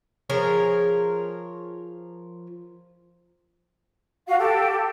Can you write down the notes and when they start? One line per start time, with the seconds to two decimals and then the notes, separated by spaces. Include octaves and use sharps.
0.30 F3 G#4 A#4 C#5
4.27 F#4 F5
4.39 G4 A4